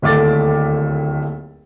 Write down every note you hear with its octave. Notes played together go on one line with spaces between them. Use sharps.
D1 D#2 A3 D6 A6